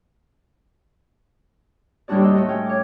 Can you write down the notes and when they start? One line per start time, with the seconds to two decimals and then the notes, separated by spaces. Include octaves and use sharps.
2.08 D#2 A2 G3 D4 F#4 D5
2.22 A2 D#5 C6 E6
2.35 A3 F#4
2.49 C#4 G5
2.66 C#5 D6